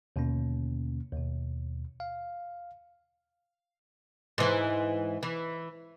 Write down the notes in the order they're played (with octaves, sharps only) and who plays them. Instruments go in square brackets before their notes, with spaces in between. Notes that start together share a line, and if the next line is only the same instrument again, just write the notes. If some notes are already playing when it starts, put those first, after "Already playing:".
[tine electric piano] D#2 B2 D3 A#3 C#4
D#2 B2
F5
[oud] G#2 E3
E3